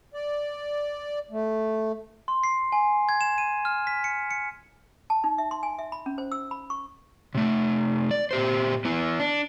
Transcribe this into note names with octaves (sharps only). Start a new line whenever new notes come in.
D5
A3
C6
C7
G#5
G#6
E7
D#7
F6
B6
C#7
C#7
A5
D#4
E5
C6
G#5
E5
B5
C#4
C5
E6
B5
C#6
C3 A3
D5
A#2 G4 C5
B3 E4
D4